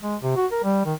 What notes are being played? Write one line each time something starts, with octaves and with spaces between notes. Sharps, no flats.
G#3
C3
F#4
A#4
G3
D#3